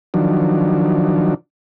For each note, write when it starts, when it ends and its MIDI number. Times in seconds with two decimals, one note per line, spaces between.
0.14 1.34 51
0.14 1.34 53
0.14 1.34 54
0.14 1.34 62